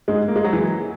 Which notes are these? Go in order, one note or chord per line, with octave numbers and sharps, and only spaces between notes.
G#2 G#3
A#3
G#3
F#3
E3